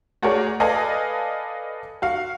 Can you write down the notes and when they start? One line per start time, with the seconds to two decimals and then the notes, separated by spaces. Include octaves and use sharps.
0.22 A3 F#4 G#4 A#4 C#5 D5
0.60 A4 B4 D5 D#5 F5 G#5
2.02 F#4 F5